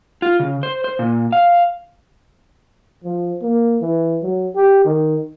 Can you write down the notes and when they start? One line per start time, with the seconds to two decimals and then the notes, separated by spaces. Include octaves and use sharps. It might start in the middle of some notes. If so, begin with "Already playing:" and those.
0.22 F4
0.40 C#3
0.63 C5
0.84 C5
0.99 A#2
1.32 F5
3.04 F3
3.42 A#3
3.82 E3
4.23 F#3
4.56 G4
4.85 D#3